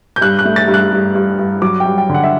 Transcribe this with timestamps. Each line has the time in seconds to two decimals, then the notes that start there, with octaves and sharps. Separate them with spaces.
0.16 G6
0.21 G2 F#6
0.39 F#6
0.45 A3
0.56 A6
0.68 G2
0.74 F#6
0.92 G2
1.15 G2
1.39 G2
1.62 F#3 D6
1.80 G5
1.86 G2
1.98 G5
2.09 D3
2.14 F#5
2.23 E5